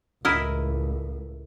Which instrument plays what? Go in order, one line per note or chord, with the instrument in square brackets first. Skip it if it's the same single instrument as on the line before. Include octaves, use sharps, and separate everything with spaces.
[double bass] C#2 A2 [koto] E4 A#4 D#5